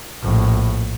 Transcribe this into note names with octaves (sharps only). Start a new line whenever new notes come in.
A#1 A2